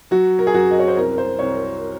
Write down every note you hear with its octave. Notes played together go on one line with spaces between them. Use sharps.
F#3 F#4
A#4
G#4
F#2 F#4
D#5
C#5
C5
C2 A#4
C5
C2 C#5